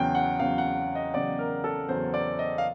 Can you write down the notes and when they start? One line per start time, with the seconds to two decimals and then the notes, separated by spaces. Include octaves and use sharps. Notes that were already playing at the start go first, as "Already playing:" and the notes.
Already playing: E2 C#3 F#3 G5
0.15 F#5
0.39 E2 C#3 F#3 F5
0.58 F#5
0.95 D#5
1.14 E2 C#3 F#3 D5
1.39 A#4
1.64 A4
1.89 E2 C#3 F#3 C5
2.14 D5
2.39 D#5
2.58 F5